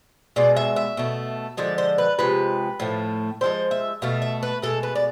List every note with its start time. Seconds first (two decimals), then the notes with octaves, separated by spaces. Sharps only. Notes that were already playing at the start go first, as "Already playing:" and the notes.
0.36 B2 G#3 D5
0.56 E5
0.76 E5
0.97 B2 A3
1.57 D3 F3 G#3 D5
1.78 C5
1.98 B4
2.19 C3 F3 G#3 B4
2.80 A2 F3 A3
3.41 D3 F3 G#3 C5
3.71 E5
4.02 B2 A3 F5
4.22 E5
4.43 B4
4.62 B2 G#3 A4
4.83 B4
4.95 D5